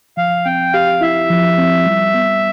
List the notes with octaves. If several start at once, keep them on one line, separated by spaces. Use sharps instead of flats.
F3 F5
C4 G5
G4 F5
E4 E5
F3
C4
G3
B3